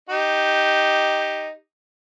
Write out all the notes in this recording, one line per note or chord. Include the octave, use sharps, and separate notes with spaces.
D#4 G4